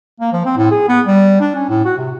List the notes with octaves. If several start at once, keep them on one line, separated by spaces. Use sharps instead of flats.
A#3
F3
C4
A2
G#4
B3
G3
D4
C#4
A2
F#4
C3